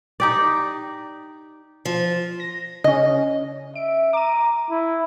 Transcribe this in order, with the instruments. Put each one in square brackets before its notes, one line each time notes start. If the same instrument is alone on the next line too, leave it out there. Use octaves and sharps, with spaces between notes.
[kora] D#4 G4 D5
[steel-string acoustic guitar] F3
[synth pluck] A#6
[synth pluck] C#3 C#4 [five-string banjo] D#5
[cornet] E5 [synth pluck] D7
[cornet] A#5 [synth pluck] D6 D#7
[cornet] E4